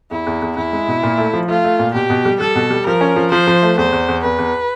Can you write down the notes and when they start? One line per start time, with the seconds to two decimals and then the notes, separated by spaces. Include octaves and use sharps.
0.11 E2 E4
0.27 E2
0.42 E2
0.57 E2 E4
0.73 G#3
0.88 B2
1.03 A#2
1.18 A3
1.33 F3
1.48 A3 F4
1.64 A3
1.79 A#2
1.94 B2 G4
2.10 B2
2.25 G3
2.40 G3 A4
2.55 B2
2.70 G3
2.86 F3 A#4
3.01 C#4
3.16 F3
3.32 F3 C5
3.47 F3
3.62 A3
3.78 E2 C5
3.93 E2
4.08 E2
4.23 E2 B4
4.38 E2